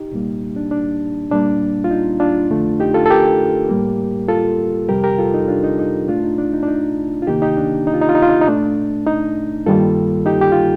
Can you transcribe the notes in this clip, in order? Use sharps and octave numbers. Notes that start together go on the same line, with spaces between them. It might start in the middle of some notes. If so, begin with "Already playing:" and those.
Already playing: D#4 G4
C2 A#2 G3 A#3
D4
D4
A#2 G3 A#3 D4
F4
D#4
D4 F4
F2 D3 A3
D#4 G4
F4 A4
A4
G4 A#4
A2 G3 A#3
F4 A4
F2 C3 G3 G4 A#4
G4 A#4
F4 A4
D#4
D4 F4
D#4
D#4
A#2 A3 D4 F4
D#4
D4
D#4
D4
D#4
F4
D2 C3 D#3 A#3 D#4 G4
D#4 G4
D4
D#4
F4
D#4
F4
D#4
F4
D#4
D#4
A#2 A3 D4
D#4
G2 D#3 G3 A#3 F4 A4
D#4 G4
G4
F4